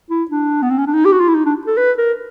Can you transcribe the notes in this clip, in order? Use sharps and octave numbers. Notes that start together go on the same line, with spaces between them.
E4
D4
B3
C4
C#4
D4
D#4
G4
F#4
F4
E4
D#4
D4
A4
B4
A#4